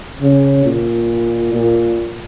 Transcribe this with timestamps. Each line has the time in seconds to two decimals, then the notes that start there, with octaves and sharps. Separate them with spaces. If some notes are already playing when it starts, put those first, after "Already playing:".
0.21 C#3
0.65 A#2
1.54 A#2